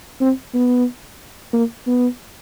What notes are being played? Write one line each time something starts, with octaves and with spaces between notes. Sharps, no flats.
C4
B3
A#3
B3